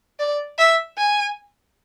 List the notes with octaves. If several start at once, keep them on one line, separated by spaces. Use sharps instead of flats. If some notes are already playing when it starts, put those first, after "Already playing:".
D5
E5
G#5